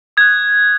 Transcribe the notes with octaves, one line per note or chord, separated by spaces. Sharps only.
D#6 F#6 G#6